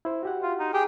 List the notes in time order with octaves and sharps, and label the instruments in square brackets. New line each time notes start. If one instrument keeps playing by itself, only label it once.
[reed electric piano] E4 C5
F#4 G4 F#5
[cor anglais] F4
D#4
[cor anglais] G4 [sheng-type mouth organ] G#4 G5